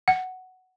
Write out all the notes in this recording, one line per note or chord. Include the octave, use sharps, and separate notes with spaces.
F#5